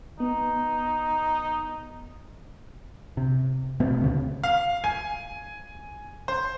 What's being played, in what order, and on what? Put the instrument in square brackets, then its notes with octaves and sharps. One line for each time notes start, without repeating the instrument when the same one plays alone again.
[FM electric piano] B3 [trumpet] D#4
[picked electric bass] C3
B2 A3 C4
D2 C#3
[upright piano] F5
G#5
C5